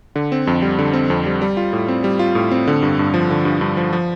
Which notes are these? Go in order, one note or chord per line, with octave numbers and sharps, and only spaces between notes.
D3
C4
F2
G3
D3
C4
F2
G3
G3
F4
A2
C4
G3
F4
A2
C4
D3
G2
G2
F3
D3
G2
G2
F3
F3